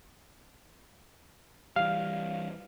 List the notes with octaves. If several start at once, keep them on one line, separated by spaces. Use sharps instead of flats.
E3 G3 F5